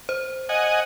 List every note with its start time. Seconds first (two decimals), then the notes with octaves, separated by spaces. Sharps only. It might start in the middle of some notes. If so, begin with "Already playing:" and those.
0.09 C5
0.49 D#5 F#5 G#5